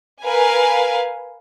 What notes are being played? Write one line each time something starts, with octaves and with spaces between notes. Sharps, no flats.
A#4 B4 F5 G#5